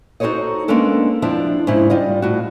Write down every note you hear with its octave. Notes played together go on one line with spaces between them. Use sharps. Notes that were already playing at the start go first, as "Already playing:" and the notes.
D#4 F#4 A4 C5 C#5 D#5
G#3 A#3 B3 C#4 D4 A4
F2 F3 D4 E4 E5
G#2 C#3 C#4 E4
G3 F4 D#5
A2 F#4